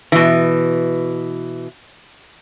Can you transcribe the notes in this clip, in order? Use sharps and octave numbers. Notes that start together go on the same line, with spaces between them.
B2 E3